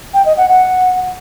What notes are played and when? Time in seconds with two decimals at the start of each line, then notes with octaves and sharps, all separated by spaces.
0.14 G5
0.26 D#5
0.37 F#5
0.49 F#5